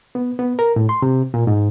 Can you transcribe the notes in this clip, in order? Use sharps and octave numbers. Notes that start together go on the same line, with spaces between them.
B3
B3
A#4
A2
C6
C3
A#2
G#2